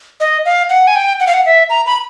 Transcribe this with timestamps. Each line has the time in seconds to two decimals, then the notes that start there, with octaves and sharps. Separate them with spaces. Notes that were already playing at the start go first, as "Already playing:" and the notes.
0.20 D#5
0.45 F5
0.70 F#5
0.87 G#5
0.96 G5
1.20 F#5
1.27 F5
1.34 F#5
1.46 E5
1.70 A#5
1.86 B5